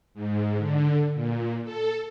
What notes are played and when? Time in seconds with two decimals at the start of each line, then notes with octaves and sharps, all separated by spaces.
0.14 G#2
0.57 D3
1.14 A#2
1.64 A4